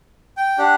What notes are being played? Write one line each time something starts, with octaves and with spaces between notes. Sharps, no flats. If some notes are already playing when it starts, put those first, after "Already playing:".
G5
D4 G4 F#5